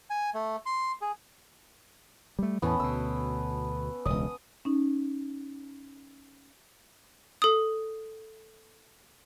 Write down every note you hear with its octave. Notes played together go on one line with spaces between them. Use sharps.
G#5
A3
C6
G#4
G3 A3
E2 A2 E3 B3 C#4 A5
D2 B2 E6
E1 C#2 D#6
C#4 D#4
A4 D#6